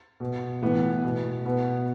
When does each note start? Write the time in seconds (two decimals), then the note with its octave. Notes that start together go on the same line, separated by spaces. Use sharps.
0.20 B2
0.62 A2 E3 B3
1.04 B2
1.45 B2 B3